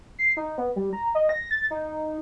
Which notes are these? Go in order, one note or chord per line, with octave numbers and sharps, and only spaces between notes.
C7
D#4
B3
G3
A#5
D#5
A#6
A6
D#4